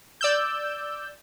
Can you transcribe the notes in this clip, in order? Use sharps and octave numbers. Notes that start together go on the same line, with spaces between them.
D5 E6 G6